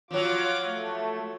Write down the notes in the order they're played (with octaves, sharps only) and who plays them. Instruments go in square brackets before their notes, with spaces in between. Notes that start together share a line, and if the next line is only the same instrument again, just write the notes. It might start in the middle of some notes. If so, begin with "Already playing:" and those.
[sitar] F3 F#3 [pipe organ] F4 D6
[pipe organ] A3